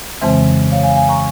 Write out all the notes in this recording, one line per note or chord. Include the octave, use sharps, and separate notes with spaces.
F2 C#3 E3 G#3 C4 C5 E5
C#5 F5
F5 G#5
F5 G#5
A#5 C#6